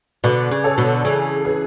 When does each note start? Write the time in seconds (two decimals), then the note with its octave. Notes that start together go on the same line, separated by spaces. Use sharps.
0.24 B2 D3 B4 D5
0.51 C#3
0.64 A4 C#5
0.78 B2 D3
1.04 C#3 E3 G#4
1.45 G#4 B4